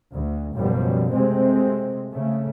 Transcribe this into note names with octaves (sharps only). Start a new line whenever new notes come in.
D2
F#1 F#2 B2 F3 G3
C3 G#3 A3 C4
C#3 A3